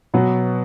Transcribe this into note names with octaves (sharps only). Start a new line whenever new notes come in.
B2 F#3 B3 F#4